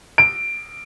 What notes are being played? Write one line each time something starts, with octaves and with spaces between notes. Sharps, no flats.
D7